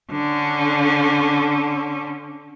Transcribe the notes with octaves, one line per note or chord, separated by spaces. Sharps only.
D3 C#4